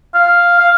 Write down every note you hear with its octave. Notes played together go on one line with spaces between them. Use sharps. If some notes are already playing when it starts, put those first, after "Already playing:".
F5
F5